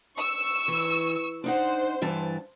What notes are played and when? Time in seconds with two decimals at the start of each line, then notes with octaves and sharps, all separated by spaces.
0.18 C#6 E6
0.68 E3
1.44 D4 D#4 C5 F#5
2.02 G2 E3 A5